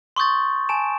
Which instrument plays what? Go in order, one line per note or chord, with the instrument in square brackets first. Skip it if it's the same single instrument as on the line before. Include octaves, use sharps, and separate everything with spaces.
[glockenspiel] C6 C#6 D#6 G6 A6
G#5 A5 D7 E7